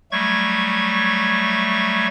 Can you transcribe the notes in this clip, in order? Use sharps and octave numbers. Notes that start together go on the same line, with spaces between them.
F#3 G3 A3 C#6 G#6